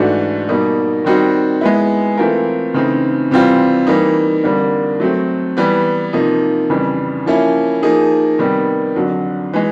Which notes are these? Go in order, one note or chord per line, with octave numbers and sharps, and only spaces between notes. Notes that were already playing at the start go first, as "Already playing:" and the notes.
Already playing: G#2 E3 A3 D4 F#4
B2 G3 A#3 D#4
D#3 G3 C4 D#4 F#4
G#3 B3 E4
E3 A3 C4 F4 A#4
C#3 E3 A3 C4 D#4
C3 E3 G3 C4 F4
E3 G3 A#3 D#4
F2 D3 G3 A#3
F#3 A3 C4
E3 G3 B3
C3 F3 A#3 D#4
F2 C#3 E3 G3
F3 A#3 C#4 E4
F3 A#3 D#4 G#4
C3 D#3 G3 B3
F2 D3 F#3
E3 G#3